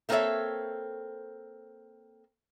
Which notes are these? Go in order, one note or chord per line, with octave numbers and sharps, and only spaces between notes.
A3 A#3 C4 A4 C#5 E5